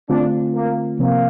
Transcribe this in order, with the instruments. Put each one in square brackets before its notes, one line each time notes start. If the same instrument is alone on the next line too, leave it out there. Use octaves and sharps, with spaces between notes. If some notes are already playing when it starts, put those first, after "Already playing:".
[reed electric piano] D3 A3 C4 F4 [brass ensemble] D4
[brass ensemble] A#3
[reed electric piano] C3 F3 C4 [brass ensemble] A#3